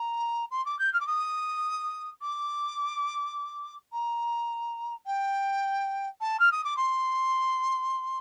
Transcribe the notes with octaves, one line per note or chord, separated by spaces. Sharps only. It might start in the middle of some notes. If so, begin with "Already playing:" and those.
Already playing: A#5
C6
D6
G6
F6
D6
D#6
D6
A#5
G5
A5
F6
D#6
D6
C6